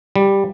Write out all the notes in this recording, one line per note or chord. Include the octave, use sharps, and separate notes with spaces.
G3